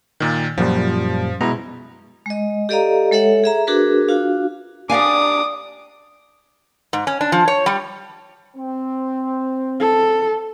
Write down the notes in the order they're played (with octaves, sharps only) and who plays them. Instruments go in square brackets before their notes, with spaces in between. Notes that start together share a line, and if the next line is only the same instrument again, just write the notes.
[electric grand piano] A#2 D#3
[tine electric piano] F#2 A#2 G3 [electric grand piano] F3
[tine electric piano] B2 A#5 [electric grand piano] G#3 E4
[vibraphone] G#3 D#5
G4 A4 D5 D#5 F5 A#5
G#3 A4 C#5 E5 F#5
G#4 E5 A#5
D4 F#4 G#4 A#4 B4
D4 F4 F#4 F5
[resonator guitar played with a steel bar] D4 G4 [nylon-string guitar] D5 F5 G#5 [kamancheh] D6 D#6
[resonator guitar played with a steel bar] G#2
C#4
D4
F3
C#5
G3
[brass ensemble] C4
[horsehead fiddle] A4